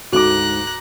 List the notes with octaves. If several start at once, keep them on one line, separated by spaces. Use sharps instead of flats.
D2 G#2 F#4 A#5 D6 F#6